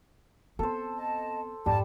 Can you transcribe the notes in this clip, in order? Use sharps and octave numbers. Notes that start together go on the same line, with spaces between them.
B3 C4 A4 C5
D#5 A5
F2 G#2 G3 A5